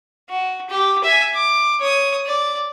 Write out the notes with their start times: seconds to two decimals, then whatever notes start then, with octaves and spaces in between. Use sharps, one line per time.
0.30 F#4
0.69 G4
1.04 E5 G#5
1.34 D6
1.80 C#5 D#6
2.26 D5